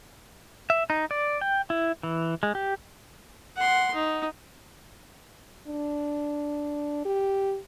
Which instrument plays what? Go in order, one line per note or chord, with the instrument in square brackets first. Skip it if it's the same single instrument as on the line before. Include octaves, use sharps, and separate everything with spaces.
[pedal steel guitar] E5
D#4
D5
G5
E4
E3
G#3
G4
[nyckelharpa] F#5 C6
D#4
[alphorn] D4
G4